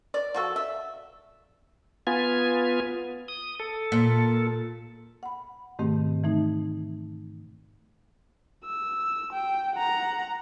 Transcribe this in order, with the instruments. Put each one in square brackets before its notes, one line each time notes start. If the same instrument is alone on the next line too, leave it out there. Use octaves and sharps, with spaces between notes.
[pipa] D5
F3 F#4 A4
E5
[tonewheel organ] B3 F4 G#5
D#6
A4
[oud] A#2
[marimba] F#5 B5
G#2 B2 D#3 A3 C4 G4
E3 A3 D#4
[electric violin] E6
G5
F#5 A#5